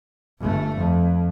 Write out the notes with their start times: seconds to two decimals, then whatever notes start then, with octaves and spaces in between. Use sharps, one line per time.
0.40 G1 A3
0.77 F2